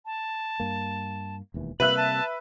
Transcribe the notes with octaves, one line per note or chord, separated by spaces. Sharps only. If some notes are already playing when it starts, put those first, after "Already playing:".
A5
G2 A#3
E1 D#2 E3
C3 G3 A#3 B4 E5 F#6 F#7
A5